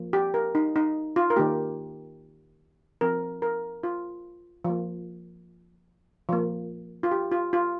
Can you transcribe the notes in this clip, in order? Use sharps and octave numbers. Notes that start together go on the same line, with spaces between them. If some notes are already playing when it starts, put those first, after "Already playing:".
Already playing: F3 A#3
G4
A#4
D#4
D#4
F4
A#4
D#3 A#3 G4
F3 C4 A#4
A#4
F4
F3 A#3
F3 A#3
F4
G4
F4
F4